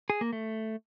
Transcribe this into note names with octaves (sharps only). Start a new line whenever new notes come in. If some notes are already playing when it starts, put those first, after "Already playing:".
G#4
A#3
A3